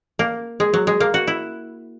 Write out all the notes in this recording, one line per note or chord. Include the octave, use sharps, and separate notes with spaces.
A#3
G#3
F#3
G#3
A#3
F#4
E4